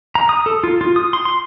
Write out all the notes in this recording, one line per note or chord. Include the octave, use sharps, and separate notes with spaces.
A#5
D#6
A4
F4
F4
D#6
C6
C6